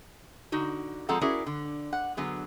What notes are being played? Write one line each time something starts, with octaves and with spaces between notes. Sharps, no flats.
D3 D#4 F#4
F3 G#3 C4 A4 F#5 A#5
C#4 E4 F#4 G#4 A#4 D5
D3
F#5
D3 F#3 B3 G#4